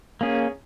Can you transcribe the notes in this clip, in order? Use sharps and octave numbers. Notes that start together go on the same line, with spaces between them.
A#3 C#4 G#4